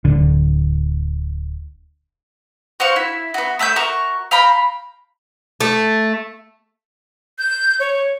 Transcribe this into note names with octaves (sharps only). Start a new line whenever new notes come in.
D1 D3
F#4 C5 F5 C#6
E4
B3 F#4
A3 E5 A#5 G6
F#4 A#4 C#6
F5 G5 A#5 B5
A3
G6
C#5